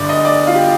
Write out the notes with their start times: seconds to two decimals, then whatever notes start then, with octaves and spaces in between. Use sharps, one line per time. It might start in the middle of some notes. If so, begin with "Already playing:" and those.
Already playing: G1 G2 D3 D5
0.09 D#5
0.25 D5
0.47 F4
0.55 G4